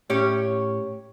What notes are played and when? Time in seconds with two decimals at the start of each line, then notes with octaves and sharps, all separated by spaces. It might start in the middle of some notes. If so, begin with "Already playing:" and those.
0.10 A2 C#4 G4 C#5